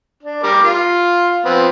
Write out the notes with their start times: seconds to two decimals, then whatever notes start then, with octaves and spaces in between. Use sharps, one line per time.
0.23 D4
0.43 G3 A#4 D6
0.64 F4 F5
1.45 F3 B3 C4